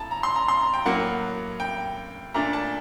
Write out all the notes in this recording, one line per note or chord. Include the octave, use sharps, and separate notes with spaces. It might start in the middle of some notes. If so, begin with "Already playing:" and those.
Already playing: A2 A5 A#5
A#5
C6
A#5
C6
A#5
G5
A2 F#3 A#3 F#5
G5
A#2 A3 D4 A#5
A5